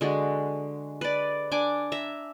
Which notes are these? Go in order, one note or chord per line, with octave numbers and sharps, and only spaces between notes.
D3 G#3 F#4
B4 D5
D4 G#5 D6
E5 A#5